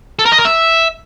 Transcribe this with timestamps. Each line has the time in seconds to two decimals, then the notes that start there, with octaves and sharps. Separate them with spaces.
0.19 A4
0.25 A#4
0.32 D#5
0.38 A#4
0.45 E5